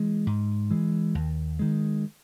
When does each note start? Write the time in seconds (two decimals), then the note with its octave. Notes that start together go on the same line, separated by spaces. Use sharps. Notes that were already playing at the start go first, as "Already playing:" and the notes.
Already playing: E3 G#3
0.27 G#2
0.71 E3 G#3
1.15 D#2
1.59 D#3 G#3